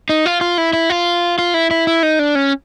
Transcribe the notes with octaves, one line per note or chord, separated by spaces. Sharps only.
D#4
F4
F4
E4
E4
F4
F4
E4
E4
E4
D#4
D4
C#4